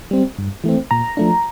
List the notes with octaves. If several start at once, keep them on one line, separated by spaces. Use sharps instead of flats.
G3 C4
G2
E3 A3 C4
A#2 A#5
F3 A3 D4